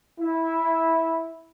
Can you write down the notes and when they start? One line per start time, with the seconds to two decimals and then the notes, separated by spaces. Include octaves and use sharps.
0.21 E4